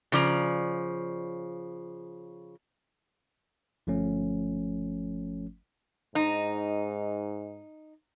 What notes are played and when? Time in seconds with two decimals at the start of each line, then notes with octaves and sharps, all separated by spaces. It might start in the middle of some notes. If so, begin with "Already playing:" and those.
0.12 C#3 F3 D5 A#5
3.87 G1 F3 A3 C#4
6.15 G#2 D#4